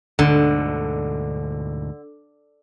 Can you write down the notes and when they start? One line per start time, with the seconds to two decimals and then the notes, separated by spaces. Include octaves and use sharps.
0.19 D2 G#2 B2 D3